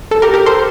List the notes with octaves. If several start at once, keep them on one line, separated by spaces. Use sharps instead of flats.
A4
G4 A#4
G4 A#4
A4 C5